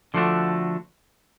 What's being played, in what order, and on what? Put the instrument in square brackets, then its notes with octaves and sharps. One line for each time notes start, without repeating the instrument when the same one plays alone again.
[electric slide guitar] D3 F3 A3 D4 F#4